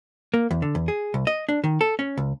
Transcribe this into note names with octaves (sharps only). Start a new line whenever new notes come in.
A#3
E2
D3
E2
G#4
C2
D#5
D4
D#3
A4
C#4
C#2